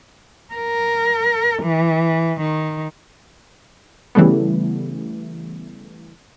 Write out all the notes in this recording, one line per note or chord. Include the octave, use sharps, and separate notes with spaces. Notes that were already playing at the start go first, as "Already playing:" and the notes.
A#4
E3
D#3
C#3 E3 G3 A3 B3